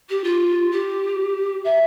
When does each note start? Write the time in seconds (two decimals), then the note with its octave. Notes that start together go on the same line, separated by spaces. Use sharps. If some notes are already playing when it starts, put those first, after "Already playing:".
0.09 G4
0.23 F4
0.71 G4
1.64 E5